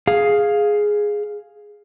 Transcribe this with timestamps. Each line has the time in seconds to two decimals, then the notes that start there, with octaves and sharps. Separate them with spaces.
0.07 G#4 F5